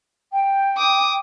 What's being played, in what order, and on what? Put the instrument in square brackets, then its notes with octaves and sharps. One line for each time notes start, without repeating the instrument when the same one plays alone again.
[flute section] G5
[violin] D6 D#6